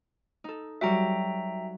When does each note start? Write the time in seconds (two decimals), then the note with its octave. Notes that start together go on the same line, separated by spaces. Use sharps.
0.44 D#4 A4
0.81 F#3 G3 F#4 E5 G5 A#5